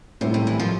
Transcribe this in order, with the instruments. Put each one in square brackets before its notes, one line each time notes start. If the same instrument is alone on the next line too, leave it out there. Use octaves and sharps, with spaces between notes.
[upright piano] A2 G3 C4 E4 [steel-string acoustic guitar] C3
[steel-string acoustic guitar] C3
E3
F3